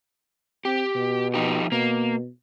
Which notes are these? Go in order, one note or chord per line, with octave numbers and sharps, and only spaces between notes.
C4 G4
B2
F3 D#4 G4
B2 A#3